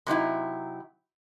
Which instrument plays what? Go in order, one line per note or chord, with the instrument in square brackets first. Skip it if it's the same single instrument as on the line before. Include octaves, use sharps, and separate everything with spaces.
[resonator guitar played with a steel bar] C3 F#3 D#4 E4